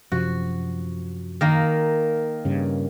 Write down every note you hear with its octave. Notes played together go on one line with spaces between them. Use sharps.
F#2 C3 F3 F#4
D#3 A#3
G2 C#3